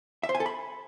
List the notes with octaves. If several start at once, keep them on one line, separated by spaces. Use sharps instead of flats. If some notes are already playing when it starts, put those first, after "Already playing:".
E5
C5
G#5
A4
B5